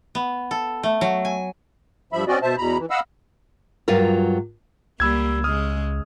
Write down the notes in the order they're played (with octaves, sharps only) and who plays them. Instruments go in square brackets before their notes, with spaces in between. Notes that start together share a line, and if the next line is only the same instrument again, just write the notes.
[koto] B3
A4
A3
F#3
G#5
[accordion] G2 F3 E5 B5
C4 C#4 F#4 D5 D#5
B2 C5 E5 A5
E2 B2 A#5 B5
E3
D#5 F5 F#5 B5 E6
[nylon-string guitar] G2 F#3 F4 A#4
[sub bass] C#2 [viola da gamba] G3 A#3 [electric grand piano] B5 E6 G#6
[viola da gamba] C#3 G#3 [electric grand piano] D#6 F6